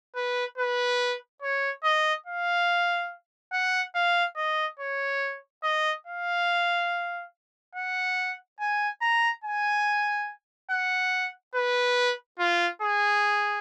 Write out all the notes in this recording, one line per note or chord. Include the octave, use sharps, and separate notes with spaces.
B4
B4
C#5
D#5
F5
F#5
F5
D#5
C#5
D#5
F5
F#5
G#5
A#5
G#5
F#5
B4
F4
G#4